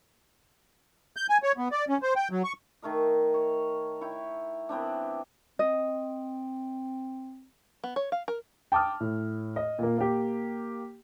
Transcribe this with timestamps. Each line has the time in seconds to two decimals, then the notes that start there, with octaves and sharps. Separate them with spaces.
1.16 G6
1.30 G#5
1.43 C#5
1.58 B3
1.72 D5
1.89 C#4
2.02 C5
2.16 G5
2.31 F#3
2.44 C#6
2.82 D#3 A3 A#4 D#5
3.34 C#5
4.01 E4 C#5 G5
4.69 E3 B3 C4 D4
5.59 C4 D#5
7.84 B3
7.96 C#5
8.12 F5
8.28 A#4
8.72 G5 A5 D6 D#6 F6
9.01 A2
9.56 D#5
9.79 A#2 A#3
9.98 A#3 G4